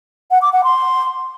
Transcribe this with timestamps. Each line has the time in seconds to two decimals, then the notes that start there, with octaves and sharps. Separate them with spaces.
0.31 F#5
0.42 D6
0.53 F#5
0.64 C6